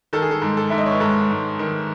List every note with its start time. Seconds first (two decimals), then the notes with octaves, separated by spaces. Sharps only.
0.13 D#3 A4
0.22 G#4
0.31 A4
0.42 G#2
0.57 A4
0.70 G#2 E5
0.78 D#5
0.86 C#5
0.92 B4
1.00 G#2 A4
1.30 G#2
1.59 D#3